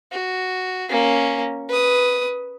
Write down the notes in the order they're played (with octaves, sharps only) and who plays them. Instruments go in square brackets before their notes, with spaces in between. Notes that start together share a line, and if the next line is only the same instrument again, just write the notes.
[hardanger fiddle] F#4
A#3 C#4
B4 D#6